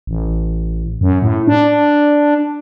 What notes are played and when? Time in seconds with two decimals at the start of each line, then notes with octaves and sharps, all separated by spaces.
0.07 A1
1.01 F#2
1.22 A2
1.47 D4